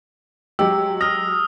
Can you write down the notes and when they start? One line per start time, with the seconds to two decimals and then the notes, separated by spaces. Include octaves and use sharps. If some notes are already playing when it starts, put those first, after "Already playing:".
0.59 F#3 G#3 G4 E6
1.01 D#6 F6 A#6